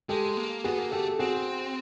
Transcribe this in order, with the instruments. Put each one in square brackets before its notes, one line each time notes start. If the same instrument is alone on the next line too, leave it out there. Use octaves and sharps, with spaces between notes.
[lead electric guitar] G#3 [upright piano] G4 A4
[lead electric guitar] A#3
[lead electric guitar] B3 [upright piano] F#4 G#4
[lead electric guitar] A#3
[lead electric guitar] A3 [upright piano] G4 A4
[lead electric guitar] C4 [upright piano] F#4 G#4